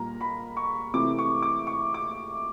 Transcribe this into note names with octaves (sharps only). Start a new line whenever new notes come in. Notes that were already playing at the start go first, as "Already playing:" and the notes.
Already playing: A#2 G3 A#3 A#5
B5
C#6
C3 E3 A3 D6
C#6
D6
C#6
D6